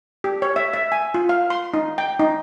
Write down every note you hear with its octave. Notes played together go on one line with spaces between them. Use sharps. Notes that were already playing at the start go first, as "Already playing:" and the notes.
G4
C#5
E5
E5
G#5
F4
F5
C6
D#4
G5
D#4